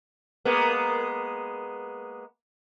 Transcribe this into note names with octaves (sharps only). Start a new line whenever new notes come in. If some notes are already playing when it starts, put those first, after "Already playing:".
G#3 A#3 B3